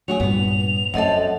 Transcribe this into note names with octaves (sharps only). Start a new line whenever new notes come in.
F#3 F#4 G#4 F7
G2 A#2 B3
F#2 F3 C4 A4 D#5 F#5 A5